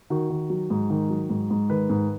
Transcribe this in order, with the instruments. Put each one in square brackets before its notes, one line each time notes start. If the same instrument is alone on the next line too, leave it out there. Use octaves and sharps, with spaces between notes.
[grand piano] D#3 F#4
D#3
F#3
G#2
D#3
F#3
G#2
G#2
D#3 B4
G#2